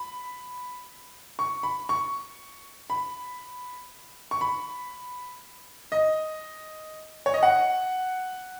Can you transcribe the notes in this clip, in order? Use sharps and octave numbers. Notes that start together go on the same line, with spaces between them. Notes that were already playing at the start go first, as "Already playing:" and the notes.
Already playing: B5
C#6
B5
C#6
B5
C#6
B5
D#5
C#5
D#5
F#5